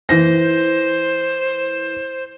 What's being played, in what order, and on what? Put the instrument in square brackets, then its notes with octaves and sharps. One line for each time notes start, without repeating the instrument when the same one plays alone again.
[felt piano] E3 A#6 [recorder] C5